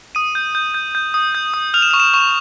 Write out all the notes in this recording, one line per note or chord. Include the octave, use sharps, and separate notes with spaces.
D#6 D#7
G6
G6
G6
G6
D#6
G6
D#6
F6 F7
E7
C#6 F7
E7
C#6